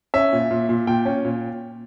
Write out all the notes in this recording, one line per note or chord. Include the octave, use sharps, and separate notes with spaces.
C#4 E5
A#2
A#2
A#2
A#2 G5
C#4
A#2